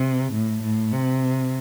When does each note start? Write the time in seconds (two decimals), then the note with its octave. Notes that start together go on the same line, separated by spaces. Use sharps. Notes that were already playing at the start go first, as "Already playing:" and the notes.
Already playing: C3
0.33 A2
0.62 A2
0.92 C3